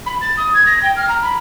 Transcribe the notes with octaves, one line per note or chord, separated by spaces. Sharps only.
B5
A6
D#6
G#6
A#6
G5
F6
A#5
B5